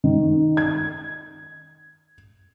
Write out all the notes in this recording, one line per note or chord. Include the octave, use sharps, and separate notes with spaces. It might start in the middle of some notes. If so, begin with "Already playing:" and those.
D#3
G#6